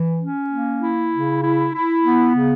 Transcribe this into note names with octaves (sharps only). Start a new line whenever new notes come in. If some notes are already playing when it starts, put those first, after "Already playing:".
Already playing: E3
C#4
A#3
E4
C#3
E4
E4
B3
C#3